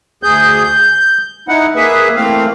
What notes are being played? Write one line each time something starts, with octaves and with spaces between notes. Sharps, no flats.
D2 G#4 G6
G6
D#4 E4 F#5
A#3 G#4 B4 E5
E3 A3 A#3 C4 F5